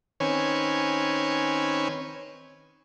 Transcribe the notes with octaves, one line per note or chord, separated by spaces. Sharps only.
D#3 C4 C#4 B4 C#5 G#5